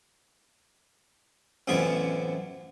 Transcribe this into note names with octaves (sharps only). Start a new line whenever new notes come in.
A1 F#2 C3 B3 F4 G#5